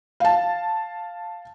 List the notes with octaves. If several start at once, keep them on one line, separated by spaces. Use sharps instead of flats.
F5 A5